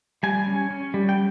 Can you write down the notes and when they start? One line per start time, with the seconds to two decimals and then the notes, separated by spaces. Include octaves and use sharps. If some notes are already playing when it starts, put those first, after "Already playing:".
0.23 G3 G#5
0.46 C#4
0.71 C#4
0.94 G3
1.09 G5